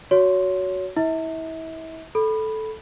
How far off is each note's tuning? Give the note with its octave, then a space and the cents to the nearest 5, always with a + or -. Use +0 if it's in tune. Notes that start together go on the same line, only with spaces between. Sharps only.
F#4 +0 C#5 +20 C6 +0
E4 -30 E5 -40
A4 -10 B5 -5